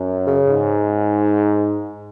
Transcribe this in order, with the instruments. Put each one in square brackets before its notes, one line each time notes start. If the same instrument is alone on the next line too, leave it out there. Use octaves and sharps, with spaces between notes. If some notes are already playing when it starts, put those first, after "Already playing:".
Already playing: [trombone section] F#2
[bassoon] C#3
[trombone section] G#2